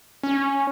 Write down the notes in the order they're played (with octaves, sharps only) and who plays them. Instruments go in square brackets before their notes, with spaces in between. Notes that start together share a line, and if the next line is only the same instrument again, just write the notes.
[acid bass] C#4